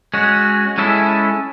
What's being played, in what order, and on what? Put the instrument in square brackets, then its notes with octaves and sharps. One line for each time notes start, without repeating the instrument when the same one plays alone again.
[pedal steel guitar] G#3 C#4 F#4
G#3 C#4 E4 A4